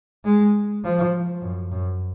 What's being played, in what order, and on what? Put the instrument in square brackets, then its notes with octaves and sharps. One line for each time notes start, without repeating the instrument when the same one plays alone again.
[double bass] G#3
F3
F#2
F#2